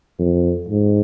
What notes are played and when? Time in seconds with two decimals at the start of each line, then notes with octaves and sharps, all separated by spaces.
0.19 F2
0.69 G#2